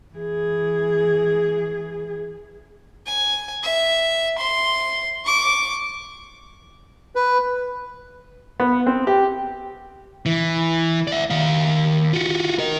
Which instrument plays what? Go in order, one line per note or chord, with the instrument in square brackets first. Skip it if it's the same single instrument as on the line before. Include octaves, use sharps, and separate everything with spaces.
[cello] E3 G#4
[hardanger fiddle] G#5
E5
C6
C#6 D6
[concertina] B4
[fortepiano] B3
C4
G4
[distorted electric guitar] E3
D5 E5
D#3 F5
F4 F#4
A#4 D#5